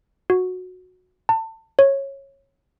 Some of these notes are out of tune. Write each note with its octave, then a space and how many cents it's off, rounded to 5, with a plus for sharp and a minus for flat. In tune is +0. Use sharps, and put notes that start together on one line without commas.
F#4 -15
A5 +25
C#5 -15